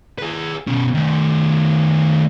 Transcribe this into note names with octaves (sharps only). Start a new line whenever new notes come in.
G#4 B4
B2 C#4
D#3 A3